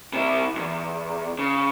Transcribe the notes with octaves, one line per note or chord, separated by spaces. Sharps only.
C3 E4
B1 E2
C#3